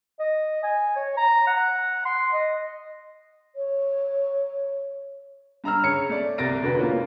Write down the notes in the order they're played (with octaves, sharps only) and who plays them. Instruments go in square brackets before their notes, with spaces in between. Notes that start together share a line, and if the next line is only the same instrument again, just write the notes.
[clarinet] D#5
G#5
C#5
A#5
F#5
C6
D#5
[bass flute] C#5
[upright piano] G2 A#5 E6 F6
C#3 C#5 C#7
A3 D5
C2 C3 A6 A#6 D7
F1 D2 F#4 B4
G#2 B2 A#3 C#4 F4